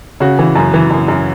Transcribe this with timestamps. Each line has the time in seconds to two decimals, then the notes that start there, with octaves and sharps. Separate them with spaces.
0.20 C#3 F#4
0.39 E3
0.56 F#2
0.74 E3
0.91 F#2
1.08 F#2